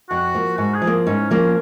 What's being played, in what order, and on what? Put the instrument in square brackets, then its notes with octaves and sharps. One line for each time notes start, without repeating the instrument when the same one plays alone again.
[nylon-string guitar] F2 [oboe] F#4
[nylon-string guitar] F3 A#3
[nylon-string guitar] G#2 [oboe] F#4
[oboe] G#4
[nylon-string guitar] F3
A#3
[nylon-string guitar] G#2 [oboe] C#4
[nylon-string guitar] F3 A#3 [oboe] C#4